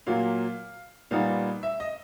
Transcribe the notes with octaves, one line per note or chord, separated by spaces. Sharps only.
A#2 F#3 A#3 F5
A#2 G3 B3 D#4 F5
E5
D#5